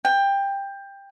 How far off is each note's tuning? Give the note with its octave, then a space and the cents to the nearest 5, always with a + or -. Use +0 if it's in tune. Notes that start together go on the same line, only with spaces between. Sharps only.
G5 +15